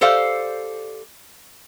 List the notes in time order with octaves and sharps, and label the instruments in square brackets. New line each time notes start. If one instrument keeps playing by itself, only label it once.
[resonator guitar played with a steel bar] G4 A4 C5 D5 F5